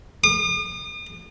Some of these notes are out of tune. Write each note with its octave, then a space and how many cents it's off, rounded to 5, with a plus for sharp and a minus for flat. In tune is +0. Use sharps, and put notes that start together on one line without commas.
D#6 -45